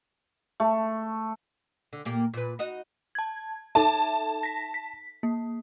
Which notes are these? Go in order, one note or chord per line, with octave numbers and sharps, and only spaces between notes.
A3
D3
A#2 A#3 G4
A#2 B4
D#4 F#4 D#5
A5 G#6
D#4 A4 E5 A5
A#6 B6
B6
A#3